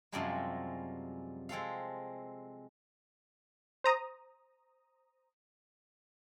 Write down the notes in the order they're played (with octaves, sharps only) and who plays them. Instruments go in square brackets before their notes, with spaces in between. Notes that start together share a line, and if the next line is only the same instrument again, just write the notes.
[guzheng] F#2 C3 F3 G3 G#3 A#3
G#3 C4 A4 F5
[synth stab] C5 A#5 D#6